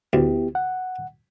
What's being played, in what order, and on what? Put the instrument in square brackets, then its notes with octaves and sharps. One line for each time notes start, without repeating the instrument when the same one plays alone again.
[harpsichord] D2 [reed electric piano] B3 E4 G4
[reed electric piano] F#5